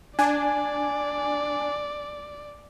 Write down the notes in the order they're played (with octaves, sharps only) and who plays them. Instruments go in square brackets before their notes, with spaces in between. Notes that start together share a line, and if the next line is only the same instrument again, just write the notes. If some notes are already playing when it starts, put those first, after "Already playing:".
[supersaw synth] D4 [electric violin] D5 [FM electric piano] G#5